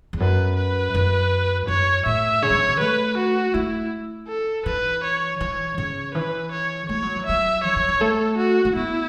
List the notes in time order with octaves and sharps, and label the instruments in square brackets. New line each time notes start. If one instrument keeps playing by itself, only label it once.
[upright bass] E2
[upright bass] F#2 [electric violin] B4
[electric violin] B4
[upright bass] F#2
[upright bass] F#2 [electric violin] C#5
[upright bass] A2 [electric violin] E5
[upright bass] C#3 [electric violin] C#5
[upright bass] F#3
E3
B2
[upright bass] A3 [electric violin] B4
[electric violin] F#4
[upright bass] A3 [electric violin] E4
[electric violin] A4
[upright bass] E3 [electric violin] B4
[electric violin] C#5
[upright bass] E3 [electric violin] C#5
[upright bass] C#3 [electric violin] C#5
[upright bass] E3 [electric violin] B4
[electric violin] C#5
[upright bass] A3 [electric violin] C#5
[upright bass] F#3
E3
[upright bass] F#3 [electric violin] E5
[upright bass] E3 [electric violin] C#5
[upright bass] E3
E3
[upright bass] A3 [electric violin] A4
[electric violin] F#4
[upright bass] A3
[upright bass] B3 [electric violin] E4